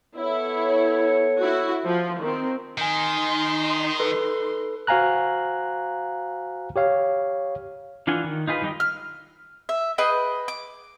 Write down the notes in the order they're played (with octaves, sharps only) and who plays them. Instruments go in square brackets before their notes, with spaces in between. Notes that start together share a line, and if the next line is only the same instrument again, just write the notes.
[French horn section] B3 A4 C#5 [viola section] E4
[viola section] E4 F#4
F3
D#3 C4
[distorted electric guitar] D#3 [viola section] D#4 C6 [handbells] G#5 G6
[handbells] A4 B4
[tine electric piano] F#4 C5 F5 G#5 A#5 F#6
G4 C#5 F5
[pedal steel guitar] E3 D4 F4 F#5 G#5
D#3
D#4 F4 G#4 B4
D#3 G3 D#4 D#5 G5
[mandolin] F6
E5
G#4 B4 D#5 G5
D6